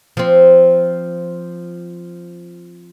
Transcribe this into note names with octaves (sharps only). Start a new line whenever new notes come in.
F3 C4